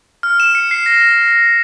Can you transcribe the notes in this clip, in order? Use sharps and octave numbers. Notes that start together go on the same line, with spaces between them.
F6
E7
C#7
C7
A#6